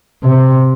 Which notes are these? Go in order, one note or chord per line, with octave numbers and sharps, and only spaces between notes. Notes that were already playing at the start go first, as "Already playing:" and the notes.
C3